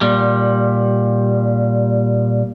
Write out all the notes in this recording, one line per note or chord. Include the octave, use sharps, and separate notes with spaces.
A#2 G3